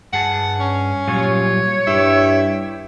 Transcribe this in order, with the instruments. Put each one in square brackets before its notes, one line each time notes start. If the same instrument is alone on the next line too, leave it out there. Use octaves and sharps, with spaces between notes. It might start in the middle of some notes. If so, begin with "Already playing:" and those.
[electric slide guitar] G2 G#4 A5 [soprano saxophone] F#5
[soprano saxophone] C#4
[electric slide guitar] A#2 F#3 F4 [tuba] G3 [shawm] C#5
[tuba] G2 [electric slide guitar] E4 G4 [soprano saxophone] E5